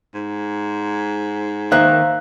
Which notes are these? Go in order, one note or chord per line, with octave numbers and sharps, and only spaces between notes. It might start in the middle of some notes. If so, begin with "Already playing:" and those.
G#2
D#3 A#3 C5 E5 F5 F#6